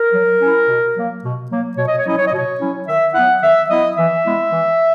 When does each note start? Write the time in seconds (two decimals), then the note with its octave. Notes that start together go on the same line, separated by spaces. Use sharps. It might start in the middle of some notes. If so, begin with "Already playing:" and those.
Already playing: A#4
0.13 F#3
0.42 C#4 E4
0.69 B2
0.97 F#3 A#3
1.23 B2
1.51 F#3 A#3
1.78 B2 C#5
1.87 D#5
1.98 C#5
2.06 F#3 C#4 E4 D#5
2.17 C#5
2.27 D#5
2.32 B2
2.37 C#5
2.61 F#3 C#4 E4
2.88 D#3 E5
3.14 F#3 B3 E4 F#5
3.42 D#3 E5
3.69 F#3 B3 E4 D#5
3.97 E3 E5
4.25 G#3 B3 E4
4.52 E3